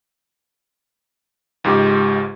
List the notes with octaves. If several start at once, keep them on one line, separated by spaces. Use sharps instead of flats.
C#2 G#2 G#3 G4